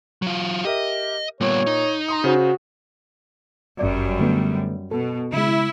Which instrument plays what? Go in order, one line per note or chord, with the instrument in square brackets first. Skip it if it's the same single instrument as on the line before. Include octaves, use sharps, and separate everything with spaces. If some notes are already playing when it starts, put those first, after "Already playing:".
[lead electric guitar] F#3 F4
[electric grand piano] G4 A#4 E5 [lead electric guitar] D#5
[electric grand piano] A#2 [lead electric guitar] G3 B3 [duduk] C#5
[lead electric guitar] D#4
[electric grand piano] A#5 C6 D#6
[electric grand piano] C#3 C5 [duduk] F#4
[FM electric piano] G1 D5 [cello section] F#2 G3
[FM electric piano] D3 A3 B3
[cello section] B2 [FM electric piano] A4
[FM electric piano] C#3 G#3 [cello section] E4